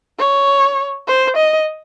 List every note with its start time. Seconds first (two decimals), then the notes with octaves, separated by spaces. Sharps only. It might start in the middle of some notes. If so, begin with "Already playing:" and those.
0.19 C#5
1.07 C5
1.37 D#5